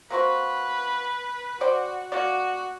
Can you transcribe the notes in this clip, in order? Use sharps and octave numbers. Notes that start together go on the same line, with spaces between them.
A#3 C4 F#4 B4
F#4 C5 D5 G5
A#3 F#4 D5